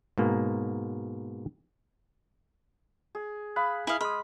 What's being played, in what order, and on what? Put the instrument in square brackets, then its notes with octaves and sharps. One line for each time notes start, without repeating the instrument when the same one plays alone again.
[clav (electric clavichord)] G#2 B2 A#3
[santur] G#4
[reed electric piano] F5 D#6 F#6 [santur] B5
[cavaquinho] E4 F5 [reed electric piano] G#5 D#6
[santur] G#3 [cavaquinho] B5 [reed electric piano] D#6 F6